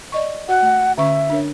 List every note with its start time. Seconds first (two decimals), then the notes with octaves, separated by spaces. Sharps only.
0.12 D5 D#5 C#6
0.49 F#4 F#5
0.62 A3
0.98 D3 C#4 E5 C#6
1.30 D4 A#4 C#5